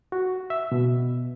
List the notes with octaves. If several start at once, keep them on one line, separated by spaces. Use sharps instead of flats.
F#4
E5
B2